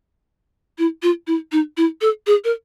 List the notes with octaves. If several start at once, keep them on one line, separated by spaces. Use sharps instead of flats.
E4
F4
E4
D#4
E4
A4
G#4
A#4